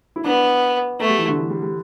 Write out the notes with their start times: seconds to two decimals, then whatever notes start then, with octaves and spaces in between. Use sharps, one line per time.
0.16 E4
0.24 B3 D4
1.00 A3 B3
1.10 G3
1.18 E3
1.28 D3
1.38 E3
1.50 G3
1.62 G3